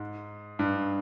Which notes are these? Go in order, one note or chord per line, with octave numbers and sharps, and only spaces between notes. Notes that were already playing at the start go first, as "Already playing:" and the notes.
Already playing: G#2
G2